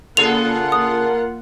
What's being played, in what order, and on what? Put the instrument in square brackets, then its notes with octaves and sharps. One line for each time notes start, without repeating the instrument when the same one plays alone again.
[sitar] C#3 G#4 A4 [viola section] A#3 F4 F#5 [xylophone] F7
[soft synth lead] A#4 [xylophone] D#6